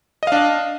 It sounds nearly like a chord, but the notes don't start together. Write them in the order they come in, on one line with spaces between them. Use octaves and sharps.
D#5 F5 D4